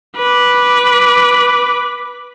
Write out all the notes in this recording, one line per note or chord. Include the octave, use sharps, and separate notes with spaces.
B4 D6